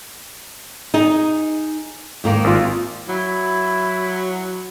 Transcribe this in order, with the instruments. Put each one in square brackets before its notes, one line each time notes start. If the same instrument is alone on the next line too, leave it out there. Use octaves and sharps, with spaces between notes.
[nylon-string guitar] D#4 G#4
G#2 D#3 A#3
[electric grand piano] G#1 F4
[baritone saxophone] F#3 [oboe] E4